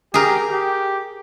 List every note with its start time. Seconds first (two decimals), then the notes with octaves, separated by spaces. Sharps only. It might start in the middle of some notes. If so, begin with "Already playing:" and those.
0.14 G4 G#4 A#4
0.51 G4